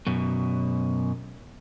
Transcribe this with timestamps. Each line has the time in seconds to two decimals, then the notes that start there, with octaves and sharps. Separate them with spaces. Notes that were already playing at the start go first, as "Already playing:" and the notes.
0.07 F#2 B2